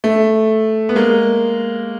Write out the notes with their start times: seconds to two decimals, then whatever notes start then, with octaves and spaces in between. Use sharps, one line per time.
0.04 A3
0.89 B3
0.96 G#3 A#3